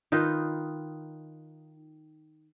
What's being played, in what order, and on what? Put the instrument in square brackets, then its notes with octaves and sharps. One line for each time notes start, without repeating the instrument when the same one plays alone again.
[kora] D#3 D#4 F4 B4